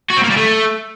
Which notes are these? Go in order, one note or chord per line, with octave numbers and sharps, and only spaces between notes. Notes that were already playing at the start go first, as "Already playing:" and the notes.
F#4
C4
A#3
G3
A3